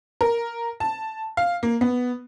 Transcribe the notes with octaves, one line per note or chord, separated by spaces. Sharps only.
A#4
A5
F5
A#3
B3